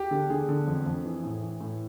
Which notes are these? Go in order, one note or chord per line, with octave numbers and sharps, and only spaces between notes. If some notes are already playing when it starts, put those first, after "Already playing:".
Already playing: G4
D3
D3 G#4
D3
F2
F2
E3
A2
E3
A2